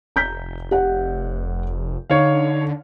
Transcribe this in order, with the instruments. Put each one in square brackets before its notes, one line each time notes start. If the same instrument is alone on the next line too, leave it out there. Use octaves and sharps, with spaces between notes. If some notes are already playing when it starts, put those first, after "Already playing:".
[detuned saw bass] F1 [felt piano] A#5 G6 B6
[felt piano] G4 F#5
[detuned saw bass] D3 [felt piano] D#4 [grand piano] C#5 F5